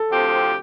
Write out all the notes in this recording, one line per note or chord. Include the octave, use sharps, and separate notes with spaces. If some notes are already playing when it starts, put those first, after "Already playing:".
Already playing: A4
D2 C3 F3 C4 G4